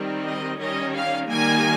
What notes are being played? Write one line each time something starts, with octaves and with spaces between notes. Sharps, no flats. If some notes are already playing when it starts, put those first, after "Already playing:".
Already playing: D#3 G3 C4
D#5
D#3 G3 C#4 D#5
F5
D#3 G3 A#3 G#5